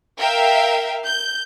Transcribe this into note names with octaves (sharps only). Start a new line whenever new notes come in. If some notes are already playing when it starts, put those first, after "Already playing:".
A#4 E5 F5 G5
G6